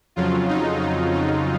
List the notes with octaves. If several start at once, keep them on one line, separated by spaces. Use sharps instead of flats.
F2 C#3 F#3 F4
D#4
D#4
D#4